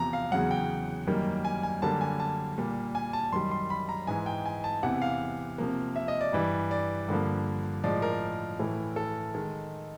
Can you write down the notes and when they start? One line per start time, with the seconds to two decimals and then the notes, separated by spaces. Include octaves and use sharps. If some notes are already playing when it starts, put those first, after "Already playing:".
Already playing: E2 C3 F3 A#5
0.13 F5
0.32 E2 C#3 F#3 F#5
0.51 G5
1.07 F#2 D#3 G3 A#3
1.45 G#5
1.63 G#5
1.82 F#2 D3 G3 A#3 A5
2.01 G#5
2.20 A5
2.58 A#2 G3 A#3
2.95 G#5
3.13 A5
3.32 F#2 D#3 G3 C6
3.51 C6
3.70 B5
3.89 A#5
4.07 G#2 E3 G#3 G#5
4.26 G5
4.46 G#5
4.64 A5
4.83 E2 C3 E3 F#5
5.02 F5
5.58 C3 F3 A#3
5.96 E5
6.08 D#5
6.21 D5
6.33 G2 E3 G3
6.71 D5
7.08 G2 D3 F3 A#3
7.84 A2 F3 G#3 D5
8.02 A#4
8.59 A2 E3 A3
8.96 A4
9.34 D#3 G#3